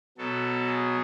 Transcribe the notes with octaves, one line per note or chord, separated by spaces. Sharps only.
B2 F#3 A4
G#4